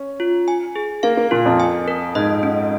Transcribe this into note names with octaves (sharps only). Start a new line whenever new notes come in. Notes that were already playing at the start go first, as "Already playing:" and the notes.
Already playing: C#4
F4
G#5
G#4
A#3 F5
A#3
A#2 F4
F2
G#5
A#4
G#2 D#5
C#4